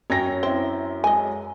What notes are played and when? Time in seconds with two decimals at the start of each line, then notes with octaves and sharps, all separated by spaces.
0.10 F#2 C#4 C#5 G5 G#5 A#6
0.43 C4 E4 G7
1.04 G#3 D#5 G#5